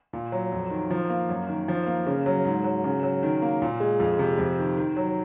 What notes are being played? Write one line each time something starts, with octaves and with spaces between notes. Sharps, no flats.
A#2
F#3
F2
D#3
F3
A#3
F#2
D#3
F3
A#3
C#3
F#3
G#2
F#3
C#3
F#3
D#3
A#3
A#2
G#3
F2
C3
F2
D#3
D#3
F#3